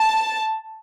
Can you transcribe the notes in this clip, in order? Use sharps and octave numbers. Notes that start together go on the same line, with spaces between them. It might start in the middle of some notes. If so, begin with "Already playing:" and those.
Already playing: A5